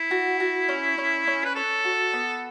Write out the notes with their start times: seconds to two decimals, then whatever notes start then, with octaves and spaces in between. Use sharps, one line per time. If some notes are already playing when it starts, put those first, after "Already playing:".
Already playing: E4
0.11 F#4
0.40 F#4
0.69 C#4
0.98 C#4
1.27 C#4
1.45 B4
1.55 A4 C#5
1.85 F#4
2.13 B3